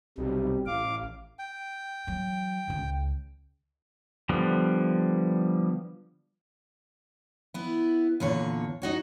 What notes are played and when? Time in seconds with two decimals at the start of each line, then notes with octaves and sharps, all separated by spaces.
0.18 B1 C3 G3
0.66 A1 F5 D6
1.39 G5
2.07 E3 F#3
2.68 C#2 C#3
4.29 D3 F3 G3 B3
7.54 B3 E4
8.20 E2 A#2 D3 C#5
8.82 D#4 F#4 C#5